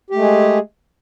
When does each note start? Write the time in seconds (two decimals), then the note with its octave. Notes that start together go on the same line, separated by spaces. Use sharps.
0.10 G4
0.14 A3
0.18 G#3
0.21 G#4